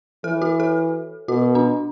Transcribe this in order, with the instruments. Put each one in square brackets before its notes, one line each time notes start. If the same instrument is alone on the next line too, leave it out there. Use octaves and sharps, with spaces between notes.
[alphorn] E3 [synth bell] A4
[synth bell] F#4
A4
[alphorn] B2 [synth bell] F#4
[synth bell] D4